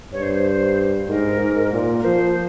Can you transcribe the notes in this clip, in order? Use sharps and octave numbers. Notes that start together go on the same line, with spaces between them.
G2 C#5
C5
C5
G#2 A#4
G#2
A#2
A#4
F3 C5